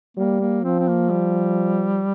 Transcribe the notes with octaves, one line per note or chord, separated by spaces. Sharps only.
G3 A#3
A#3
F3 C4
C4
A#3
G3